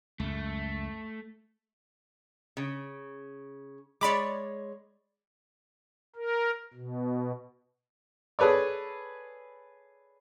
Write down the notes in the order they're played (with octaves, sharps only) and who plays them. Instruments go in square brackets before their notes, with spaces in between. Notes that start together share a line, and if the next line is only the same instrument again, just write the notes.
[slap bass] C#2 F#2 [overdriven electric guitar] A3
[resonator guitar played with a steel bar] C#3
[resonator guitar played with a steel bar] G#3 C#5 [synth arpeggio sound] D5 B5 D6
[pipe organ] A#4
B2
[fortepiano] G#4 A4 B4 C#5 D5